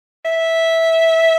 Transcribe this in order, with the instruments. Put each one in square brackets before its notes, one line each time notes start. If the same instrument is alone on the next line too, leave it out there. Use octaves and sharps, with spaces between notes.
[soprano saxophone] E5